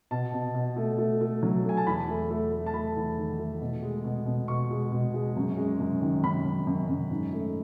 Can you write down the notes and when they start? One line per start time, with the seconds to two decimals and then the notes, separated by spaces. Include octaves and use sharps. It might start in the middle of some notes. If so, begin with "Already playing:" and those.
0.11 B2 A5
0.33 B2
0.55 B2
0.76 A3
0.98 A3
1.21 A3
1.43 F#3
1.64 A3
1.69 G#5
1.77 A5
1.87 E2 B5
2.08 A3
2.30 A3
2.52 A3
2.66 A5
2.74 A3 B5
2.96 E2
3.17 D#3
3.39 A3
3.61 B2
3.83 G#3
4.04 B2
4.26 B2
4.48 B2 C#6
4.71 G#3
4.92 B2
5.14 G#3
5.36 F#2
5.57 G#3
5.80 F#2
6.02 D#3
6.23 F#2 B5
6.45 F#2
6.67 F#2
6.88 F#2
7.10 G#2
7.32 A3